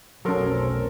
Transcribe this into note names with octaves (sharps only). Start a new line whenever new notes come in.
F1 B1 F#3 C4 C#4 A4 A#4 C6